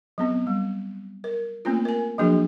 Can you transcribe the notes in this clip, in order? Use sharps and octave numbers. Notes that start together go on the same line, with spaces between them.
F#3 B3 C4
G3
A#4
A3 A#3 C4 C#4 F4
A#4 G#5
F3 F#3 A#3 D4 F#4 G#4